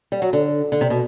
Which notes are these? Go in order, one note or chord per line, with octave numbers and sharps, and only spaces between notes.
G3
F#3
D3
D3
C3
B2